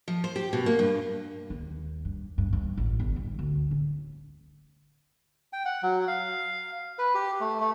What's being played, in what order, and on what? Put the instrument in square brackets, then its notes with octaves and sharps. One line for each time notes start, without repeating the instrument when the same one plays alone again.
[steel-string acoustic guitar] F3
C5
G4
B2
A#3
G2
[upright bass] D#2
G2
G2
G2
A1
G1
G2
D2
C#4
[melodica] G5
F#5
F#3
F5
B4
G4
A3
A3